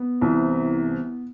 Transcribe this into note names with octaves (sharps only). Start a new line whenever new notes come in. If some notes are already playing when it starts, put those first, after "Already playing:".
Already playing: B3
C2 C3 E3